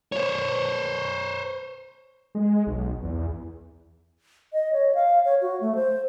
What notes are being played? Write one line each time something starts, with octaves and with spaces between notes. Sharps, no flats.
C5 C#5
G#3
B1
E2
D#5
C#5
F5
C#5
F#4
A3
C5